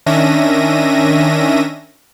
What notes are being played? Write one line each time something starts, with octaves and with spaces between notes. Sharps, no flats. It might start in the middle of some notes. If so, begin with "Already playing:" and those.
D#3 C#4 D4 E5 A#6 D#7